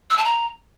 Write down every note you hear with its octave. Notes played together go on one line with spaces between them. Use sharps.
E6
A5
A#5